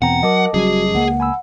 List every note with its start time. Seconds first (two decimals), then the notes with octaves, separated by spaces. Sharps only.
0.02 E2 B2 C4 F#5 G5 A#5
0.23 F#3 A#4 D#5 A5 D6
0.54 F#1 F#2 G3 F#4 G#4
0.95 C#2 A#3 F#5
1.20 G#5 B5 E6